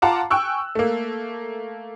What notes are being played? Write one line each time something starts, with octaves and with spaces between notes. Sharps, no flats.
F4 F#5 A5 A#5 D6
G5 G#5 C#6 E6 F#6
A3 A#3